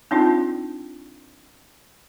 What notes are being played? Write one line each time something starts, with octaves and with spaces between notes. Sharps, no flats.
C4 D4 D#4 F4